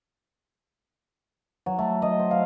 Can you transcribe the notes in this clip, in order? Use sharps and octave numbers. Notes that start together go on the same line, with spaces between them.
F#3
A3
D#5
C5
F5